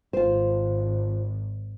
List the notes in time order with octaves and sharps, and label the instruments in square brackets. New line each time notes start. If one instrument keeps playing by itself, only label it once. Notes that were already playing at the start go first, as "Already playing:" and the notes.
[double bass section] G#1 [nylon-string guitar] F4 C5